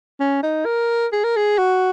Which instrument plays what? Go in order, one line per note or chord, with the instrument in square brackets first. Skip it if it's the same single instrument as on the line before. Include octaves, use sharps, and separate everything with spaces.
[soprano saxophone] C#4
D#4
A#4
G#4
A#4
G#4
F#4